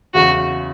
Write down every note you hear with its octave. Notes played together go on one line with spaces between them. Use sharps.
F#1 E2 C#3 F#4